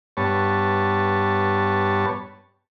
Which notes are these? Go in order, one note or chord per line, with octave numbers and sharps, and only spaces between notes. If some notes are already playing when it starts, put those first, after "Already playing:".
G2 B3 C#5 A5